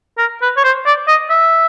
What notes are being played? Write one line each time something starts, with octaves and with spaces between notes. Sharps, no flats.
A#4
B4
C#5
C5
D5
D#5
E5